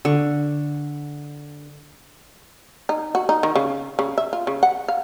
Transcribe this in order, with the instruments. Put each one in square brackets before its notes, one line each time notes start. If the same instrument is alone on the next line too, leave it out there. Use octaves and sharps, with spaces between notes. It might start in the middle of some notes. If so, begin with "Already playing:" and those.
[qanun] D3 C#6
[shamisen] D#4
F#4
D#4
D#3
C#3
C#3
E5
F4
C#3
F#5
F5